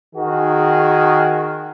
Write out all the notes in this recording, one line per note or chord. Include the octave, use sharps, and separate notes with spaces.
D#3 F#4 G#4